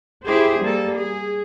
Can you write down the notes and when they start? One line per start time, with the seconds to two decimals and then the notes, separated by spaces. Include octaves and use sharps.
0.25 E4 G4 G#4 C5
0.62 G3 A#3 A4
0.96 G#4